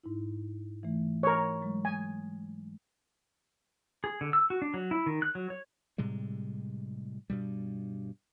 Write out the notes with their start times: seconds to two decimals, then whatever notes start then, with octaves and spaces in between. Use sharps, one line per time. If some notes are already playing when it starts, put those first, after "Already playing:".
0.03 G#2 D#4 E4
0.83 E3 A3
1.23 A#4 C#5
1.62 F#3 G#3
1.85 G#5
4.04 G#4
4.21 D3
4.33 E6
4.50 F#4
4.62 D4
4.74 F#3
4.91 E4
5.06 D#3
5.22 F#6
5.35 F#3
5.50 C#5
5.98 A2 C3 G3 G#3
7.30 G2 B2 G3